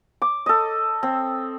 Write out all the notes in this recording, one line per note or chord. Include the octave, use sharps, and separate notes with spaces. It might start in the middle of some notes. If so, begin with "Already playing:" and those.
D6
A4 D#5
C4